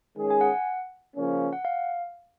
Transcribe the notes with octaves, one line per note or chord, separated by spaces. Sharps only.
D#3 G#3 C#4 G#4
G#5
F#5
C#3 F3 A#3 C#4
F#5
F5